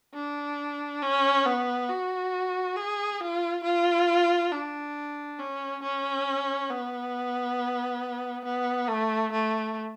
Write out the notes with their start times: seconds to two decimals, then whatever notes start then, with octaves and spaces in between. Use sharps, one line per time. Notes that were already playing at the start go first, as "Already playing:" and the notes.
0.14 D4
1.02 C#4
1.46 B3
1.89 F#4
2.76 G#4
3.20 F4
3.64 F4
4.51 D4
5.39 C#4
5.82 C#4
6.70 B3
8.45 B3
8.88 A3
9.32 A3